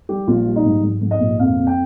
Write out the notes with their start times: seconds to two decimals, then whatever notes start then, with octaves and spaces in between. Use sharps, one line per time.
0.09 G3 G4
0.27 A#1 F4
0.47 G3
0.56 D#4
0.65 G#2
0.83 G#2
1.01 G#2
1.11 D#5
1.20 A#1
1.39 F2 F5
1.57 F2
1.67 G5